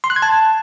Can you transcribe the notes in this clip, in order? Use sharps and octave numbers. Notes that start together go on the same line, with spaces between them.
C6
F#6
G#6
A5